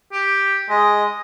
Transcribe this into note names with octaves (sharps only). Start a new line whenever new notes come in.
G4
G#3 D#5